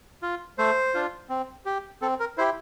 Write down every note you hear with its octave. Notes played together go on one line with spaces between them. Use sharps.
F4
A3 C5
D4 F4
C4
G4
C4 A4
A#4
E4 G4 C5